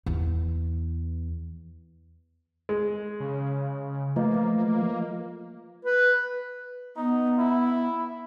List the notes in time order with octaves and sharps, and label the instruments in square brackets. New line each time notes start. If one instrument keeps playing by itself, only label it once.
[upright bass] E2
[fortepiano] G#3
[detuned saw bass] C#3
[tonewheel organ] F3 A3 [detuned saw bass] A#3 [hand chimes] F4 B4 D#5
[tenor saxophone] B4
[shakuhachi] B3 [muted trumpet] D#4
[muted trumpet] E4